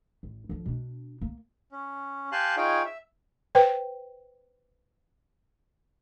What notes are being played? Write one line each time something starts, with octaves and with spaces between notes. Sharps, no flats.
A1
D3 F3
B2 D4
A#3
C#4
G4 F5 G#5 A5 C6 F#6
D#4 F4 G#4 C#5 F5 G5
E5
B4 C5 G5